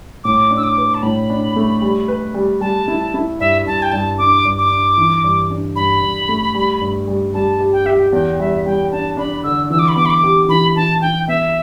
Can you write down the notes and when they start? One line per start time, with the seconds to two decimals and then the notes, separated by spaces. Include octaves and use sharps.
0.24 A2 D6
0.51 D4
0.57 E6
0.64 D6
0.78 B4
0.94 A5
1.03 A2 B5
1.30 D4
1.56 A3
1.82 G3
2.08 B4
2.34 G3
2.61 G3 A5
2.88 E4
3.14 E4
3.40 G2 E5
3.65 G2 A5
3.82 G5
3.92 G2 A5
4.18 D4 D6
4.45 G2
4.58 D6
4.71 D4
4.97 E3
5.24 G2
5.51 D4
5.76 G2 B5
6.02 G2
6.29 A3
6.54 G3
6.81 G2
7.07 G3
7.34 G3 A5
7.60 G4
7.73 G5
7.86 G4 E5
7.99 G5
8.13 E2 G5
8.40 G3 E5
8.66 G3 G5
8.92 D4 A5
9.17 D4 B5
9.44 D3 E6
9.70 E3 E6
9.79 D6
9.88 B5
9.96 B3 D6
10.05 B5
10.10 D6
10.23 G4
10.48 E3 B5
10.76 E3 A5
11.01 E3 G5
11.28 B3 E5